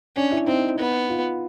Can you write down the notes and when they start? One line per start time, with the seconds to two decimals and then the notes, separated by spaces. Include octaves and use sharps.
0.16 C#4 D4
0.32 E4
0.47 C4 D#4
0.78 B3
1.09 F4